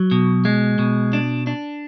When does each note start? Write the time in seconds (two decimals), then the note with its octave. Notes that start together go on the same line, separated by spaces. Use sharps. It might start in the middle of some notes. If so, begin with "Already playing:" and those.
Already playing: F#3
0.11 B2
0.45 G#3
0.79 B2
1.13 D4
1.47 D4